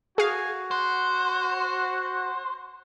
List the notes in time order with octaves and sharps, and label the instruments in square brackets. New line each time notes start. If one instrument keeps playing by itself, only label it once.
[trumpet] F#4 [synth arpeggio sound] G#4 F5 [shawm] G#5
[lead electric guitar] C5 [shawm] F#5